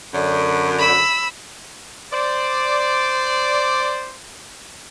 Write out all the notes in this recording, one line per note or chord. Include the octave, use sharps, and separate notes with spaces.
F#2 D3
B5 E6
C5 D5